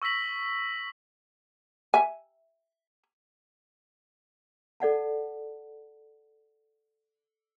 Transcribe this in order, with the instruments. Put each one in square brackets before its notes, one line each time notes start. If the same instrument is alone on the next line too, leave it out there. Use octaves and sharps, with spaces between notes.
[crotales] C#6 E6 A#6 B6 F#7
[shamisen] E5 G#5
[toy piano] A4 D5 F#5 A5